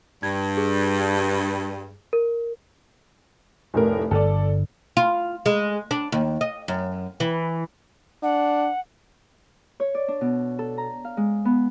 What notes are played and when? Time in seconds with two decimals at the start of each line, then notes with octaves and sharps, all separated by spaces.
0.23 G2 G#6
0.57 G#4
2.13 A#4
3.74 F1 A2 A#4
4.11 G1 G2 A4 D5
4.97 F4
5.46 G#3
5.91 D4
6.12 D#2
6.41 D#5
6.68 F#2
7.20 E3
8.23 D4 F#5
9.80 C#5
9.95 D5
10.08 D4
10.21 B2
10.59 A4
10.78 A#5
11.04 F5
11.17 G#3
11.45 B3